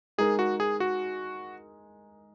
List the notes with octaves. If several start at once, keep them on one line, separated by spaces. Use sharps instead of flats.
G#3 D#4 G#4 A#4
F#4
G#4
F#4